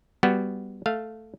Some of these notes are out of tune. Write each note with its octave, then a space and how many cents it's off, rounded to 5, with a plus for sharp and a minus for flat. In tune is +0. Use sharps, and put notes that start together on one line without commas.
G3 +0 B3 +0 F#4 +0
A3 +0 F5 +0